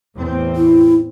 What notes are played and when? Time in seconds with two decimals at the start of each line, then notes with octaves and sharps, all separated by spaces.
0.16 E2 A2 C4
0.55 E4